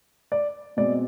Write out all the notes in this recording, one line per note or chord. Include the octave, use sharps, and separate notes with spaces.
D5
B2 G#3 C4 D5